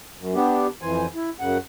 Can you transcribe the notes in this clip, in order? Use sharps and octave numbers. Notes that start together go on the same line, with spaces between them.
F#2
B3 D4 G4
F2 E3 C5 G#5
E4
F#2 C#3 F#5